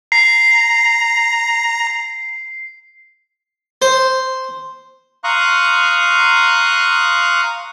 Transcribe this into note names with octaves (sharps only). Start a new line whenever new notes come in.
A#5 C7
C5
F5 A#5 C6 C#6 D#6 F#6